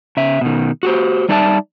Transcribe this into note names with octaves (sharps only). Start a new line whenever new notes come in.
C#3 E5
B2 D#3
F#4 G4 C5
G3 D4 D#4 D5 E5 A5